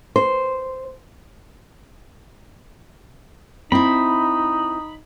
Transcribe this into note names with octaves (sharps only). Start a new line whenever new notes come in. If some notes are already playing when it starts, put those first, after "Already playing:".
C5
C4 D#4 E4 B5